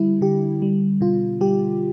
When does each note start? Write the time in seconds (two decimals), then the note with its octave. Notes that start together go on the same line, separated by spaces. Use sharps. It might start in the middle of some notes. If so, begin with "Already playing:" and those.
Already playing: D3 G3 E4
0.21 D3 G4
0.62 G3
1.01 B2 F4
1.41 G3 G4